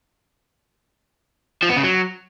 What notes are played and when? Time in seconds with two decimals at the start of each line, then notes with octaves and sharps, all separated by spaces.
1.63 F3
1.70 B3
1.77 C#3
1.83 F#3